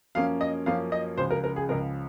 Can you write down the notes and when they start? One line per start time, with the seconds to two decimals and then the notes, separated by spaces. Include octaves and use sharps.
0.15 F#2 F3 A#3 C#4 F5
0.41 D#5
0.66 F#2 F3 A#3 C#4 F5
0.92 D#5
1.17 C#2 C#3 F3 C5
1.31 A#4
1.44 A#4
1.56 G#4
1.69 C#2 C#3 F3 A#4